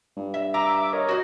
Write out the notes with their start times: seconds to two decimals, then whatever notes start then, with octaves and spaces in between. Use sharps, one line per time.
0.17 G2
0.34 E5
0.54 E5 A#5 D6
0.93 A#4 C#5 D#5
1.08 F#4 C5